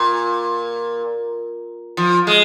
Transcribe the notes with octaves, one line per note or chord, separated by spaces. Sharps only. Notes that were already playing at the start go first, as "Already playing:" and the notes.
Already playing: A#2
F3
G#3